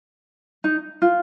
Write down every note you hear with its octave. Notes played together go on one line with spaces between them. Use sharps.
D#4
F4